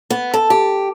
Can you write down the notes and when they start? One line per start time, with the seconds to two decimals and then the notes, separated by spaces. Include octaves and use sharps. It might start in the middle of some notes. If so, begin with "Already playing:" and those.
0.10 B3
0.34 A4
0.50 G4